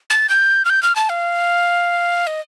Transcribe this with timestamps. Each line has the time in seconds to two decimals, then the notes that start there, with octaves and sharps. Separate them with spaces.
0.10 A6
0.29 G6
0.65 F6
0.70 G6
0.83 F6
0.96 A5
1.09 F5
2.27 D#5